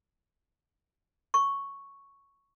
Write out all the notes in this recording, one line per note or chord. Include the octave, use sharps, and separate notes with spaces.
C#6